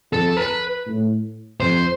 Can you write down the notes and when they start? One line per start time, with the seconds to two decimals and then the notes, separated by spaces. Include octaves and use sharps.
0.12 F2 A4
0.37 B4
0.87 A2
1.60 F2 C5